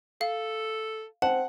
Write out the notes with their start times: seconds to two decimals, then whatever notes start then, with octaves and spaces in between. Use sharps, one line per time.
0.21 A4 F5
1.22 C4 F#5 A5